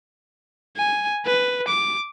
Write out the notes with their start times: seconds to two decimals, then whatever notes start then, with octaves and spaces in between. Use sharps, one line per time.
0.77 G#5
1.26 B4
1.68 D6